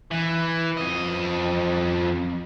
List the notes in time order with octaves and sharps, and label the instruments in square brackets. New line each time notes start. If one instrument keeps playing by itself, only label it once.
[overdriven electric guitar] E3
F2 D#5